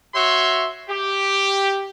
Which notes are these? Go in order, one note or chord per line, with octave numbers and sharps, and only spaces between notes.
F#4 C#5 E5 C6
G4